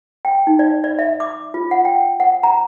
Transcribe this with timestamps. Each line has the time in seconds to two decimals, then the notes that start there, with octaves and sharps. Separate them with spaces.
0.25 G5
0.47 D#4
0.59 D5
0.84 D5
0.99 E5
1.20 D6
1.54 F4
1.71 F#5
1.85 G5
2.20 F#5
2.43 A#5